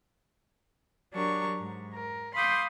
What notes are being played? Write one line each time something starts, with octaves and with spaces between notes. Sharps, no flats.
F#3 D4 G4 A#4 C#6
G#2
A#4
F5 B5 C6 D6 D#6 G6